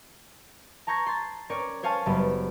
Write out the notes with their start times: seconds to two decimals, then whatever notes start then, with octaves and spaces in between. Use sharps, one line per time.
0.87 A5 A#5 C#6 G6 G#6 A#6
1.06 C6 A6
1.49 C4 C#4 A#4 C#5 D5
1.83 C5 C#5 F5 G#5 A5
2.06 F#1 G3 B3